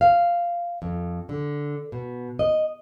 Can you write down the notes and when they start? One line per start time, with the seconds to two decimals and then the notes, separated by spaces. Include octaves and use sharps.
0.01 F5
0.82 F2
1.29 D3
1.92 B2
2.39 D#5